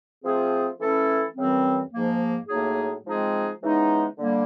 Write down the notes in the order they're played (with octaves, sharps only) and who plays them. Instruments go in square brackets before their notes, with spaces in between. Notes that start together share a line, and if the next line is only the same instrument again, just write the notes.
[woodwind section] F3 A3 C4 F4 G#4
E3 A3 C#4 E4 A4
F#2 C#3 E3 G3 C4
G#2 F3 A#3
A2 F#3 A#3 D#4 G#4
F3 G#3 C4 D#4 G#4
C#3 E3 G#3 B3 D#4
D3 G3 A#3